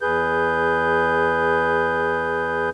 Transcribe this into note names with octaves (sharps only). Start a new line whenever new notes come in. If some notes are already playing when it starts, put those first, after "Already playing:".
E2 G#4 B4 G6